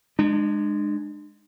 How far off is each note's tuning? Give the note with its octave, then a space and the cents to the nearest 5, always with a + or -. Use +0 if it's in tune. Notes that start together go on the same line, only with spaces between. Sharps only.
G#3 +0 D4 +40